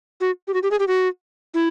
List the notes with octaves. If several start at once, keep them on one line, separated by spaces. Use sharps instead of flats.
F#4
G4
F#4
G4
G#4
G4
F#4
E4